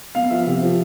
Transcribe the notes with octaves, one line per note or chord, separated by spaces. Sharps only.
B3 F5
F3 E5
C3
F3